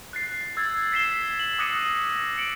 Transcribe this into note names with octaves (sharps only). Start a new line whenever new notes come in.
F#6 A6 C7
E6 G#6 A6
B6 C7 E7 G7
F#7
D6 D#6 F#6 A#6 C#7 D#7
C#7 D7 F#7